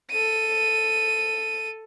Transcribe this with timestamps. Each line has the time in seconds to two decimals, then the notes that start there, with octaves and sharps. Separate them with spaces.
0.10 A4 D#7